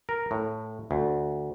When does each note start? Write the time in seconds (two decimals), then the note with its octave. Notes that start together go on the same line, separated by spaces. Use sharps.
0.09 A#4
0.31 A2
0.91 D2